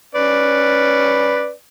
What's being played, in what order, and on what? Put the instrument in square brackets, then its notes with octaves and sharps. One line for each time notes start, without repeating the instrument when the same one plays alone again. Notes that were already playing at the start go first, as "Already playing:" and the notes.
[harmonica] C#4 B4 D5